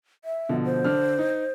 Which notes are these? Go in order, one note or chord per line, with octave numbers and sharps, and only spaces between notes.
E5
B2 D3 F3
C5
D3 D4 F6
D#4